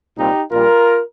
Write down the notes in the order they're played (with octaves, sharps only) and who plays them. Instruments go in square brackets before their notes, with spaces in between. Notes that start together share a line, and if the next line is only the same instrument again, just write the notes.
[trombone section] C2 A#2 G3 C4 D#4 G4
A#1 A#2 G3 F4 A#4